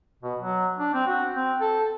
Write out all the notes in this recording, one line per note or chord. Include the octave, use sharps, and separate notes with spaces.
B2
F#3
D4
C4
F#4
C4
A4